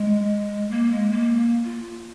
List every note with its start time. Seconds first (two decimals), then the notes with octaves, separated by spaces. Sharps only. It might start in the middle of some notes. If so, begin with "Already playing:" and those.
Already playing: G#3
0.70 A#3
0.90 G#3
1.11 A#3
1.64 F4